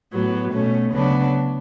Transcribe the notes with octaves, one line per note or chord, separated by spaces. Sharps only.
A2 F#3 B3
B2 A3 C#4
D2 C#3 F#3 B3 D4